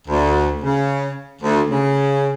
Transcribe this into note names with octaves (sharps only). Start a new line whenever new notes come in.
D2
C#3
D2
C#3